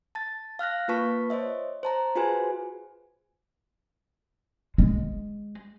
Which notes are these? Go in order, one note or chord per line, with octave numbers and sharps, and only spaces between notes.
A5 A6
F5 F6 F#6 A#6
A#3 F4 B4 A5 C#6 B6
C5 C#5 D#5 E5
C5 A5 A#5
F4 F#4 G#4 B4 C5 G#5
G#3